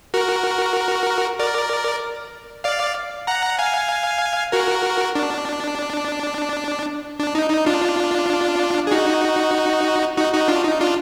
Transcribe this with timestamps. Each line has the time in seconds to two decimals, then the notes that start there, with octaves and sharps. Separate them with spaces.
0.14 F#4 A#4
1.39 A#4 D5
2.64 D5 F5
3.27 F#5 A#5
3.59 F5 G#5
4.52 F#4 A#4
5.15 D4
7.20 D4
7.35 D#4
7.50 D#4
7.66 D4 F4
8.87 G#4
8.91 D#4 F#4
10.17 D#4 F#4
10.33 D#4 F#4
10.48 D4 F4
10.64 D#4
10.80 D4 F4